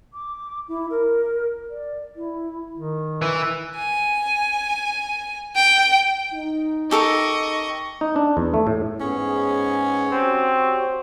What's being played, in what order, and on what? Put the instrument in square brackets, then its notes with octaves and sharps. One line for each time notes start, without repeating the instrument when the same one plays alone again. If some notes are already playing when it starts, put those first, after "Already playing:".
[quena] D6
E4
A#4
D5
E4
[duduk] D#3
[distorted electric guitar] E3
[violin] G#5
G5
[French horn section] D#4
[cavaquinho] G4 A4 A#4 [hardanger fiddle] D#5 C#6
[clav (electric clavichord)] D#4
D4
E2
A3
A2
[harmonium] G#2 B3 G#4 [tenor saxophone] C#4
[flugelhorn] C4 [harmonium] F#4 G4 C#5